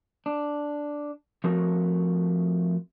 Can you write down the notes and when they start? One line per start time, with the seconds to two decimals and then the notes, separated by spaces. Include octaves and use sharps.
0.26 D4
1.44 F3 A3 C4 F#4 A#4 C#5